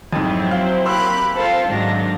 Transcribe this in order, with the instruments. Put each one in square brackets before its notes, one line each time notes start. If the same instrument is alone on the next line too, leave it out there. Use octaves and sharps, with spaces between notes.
[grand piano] F2 G#2 [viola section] F#3 C4 E4
[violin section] C5 [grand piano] F5
[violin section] A#3 G4 [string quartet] B5 F#6 [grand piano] C6 E6
[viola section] C4 [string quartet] F4 A4 [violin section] C5 F5
[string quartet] G#2 [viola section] D#3 F#3 [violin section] D4 F5 A#6